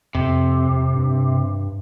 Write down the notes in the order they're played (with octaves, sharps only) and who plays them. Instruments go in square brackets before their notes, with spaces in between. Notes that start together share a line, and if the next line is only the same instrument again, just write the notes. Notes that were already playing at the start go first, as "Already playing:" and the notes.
[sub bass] F2 [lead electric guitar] C3
[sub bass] G2